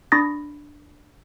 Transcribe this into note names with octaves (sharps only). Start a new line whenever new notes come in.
D4 B5 C#6 D#6 A6 A#6